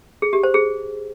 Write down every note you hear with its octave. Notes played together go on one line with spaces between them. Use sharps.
G#4
G4
C5
G#4